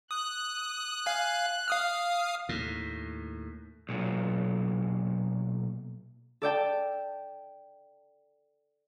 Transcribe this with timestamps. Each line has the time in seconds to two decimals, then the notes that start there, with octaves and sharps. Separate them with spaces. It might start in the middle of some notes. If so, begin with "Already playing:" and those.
0.11 D#6 F#6
1.06 F5 G#5
1.68 F5 D#6 F6
2.49 D#2 A2
3.89 B1 A#2
6.42 A4 D5 G5 A5